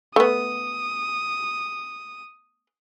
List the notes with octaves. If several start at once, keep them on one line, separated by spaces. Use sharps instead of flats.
A3 B3 D#6